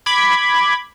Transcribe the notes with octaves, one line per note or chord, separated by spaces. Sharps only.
B5 D6 G#6